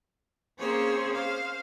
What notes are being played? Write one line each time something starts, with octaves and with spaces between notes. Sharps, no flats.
A#3 C4 C#4 G#4 C5 C#5
C5 F5